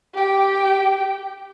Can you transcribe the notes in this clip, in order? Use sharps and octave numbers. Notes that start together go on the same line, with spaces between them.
G4 G5